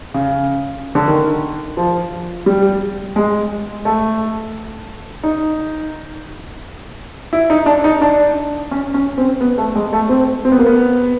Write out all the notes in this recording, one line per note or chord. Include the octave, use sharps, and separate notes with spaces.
C#3
D3
D#3
F3
G3
G#3
A3
D#4
E4
D#4
D4
D#4
D4
C#4
C#4
C4
B3
A3
G#3
A3
C4
C4
B3
A#3
B3